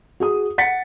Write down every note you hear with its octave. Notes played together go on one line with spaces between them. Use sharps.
F#4 G#4 D#6
F#5 A6 B6 C#7